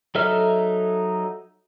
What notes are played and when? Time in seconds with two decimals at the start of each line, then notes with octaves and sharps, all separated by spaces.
0.15 F#3 D#4 A4 E5 F6